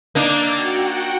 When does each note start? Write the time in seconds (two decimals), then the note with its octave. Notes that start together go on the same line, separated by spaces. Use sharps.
0.15 A#3 D4 D#4 E6 G6 A6
0.53 F#4 F#5 G5